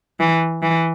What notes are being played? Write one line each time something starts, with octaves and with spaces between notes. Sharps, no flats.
E3
E3